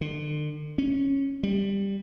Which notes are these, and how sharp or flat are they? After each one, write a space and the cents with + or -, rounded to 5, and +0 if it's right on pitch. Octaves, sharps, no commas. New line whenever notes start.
D3 +40
C#4 -10
G3 +10